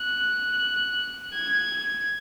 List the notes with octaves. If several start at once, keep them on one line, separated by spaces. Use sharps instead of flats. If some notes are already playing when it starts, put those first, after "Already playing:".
Already playing: F#6
G#6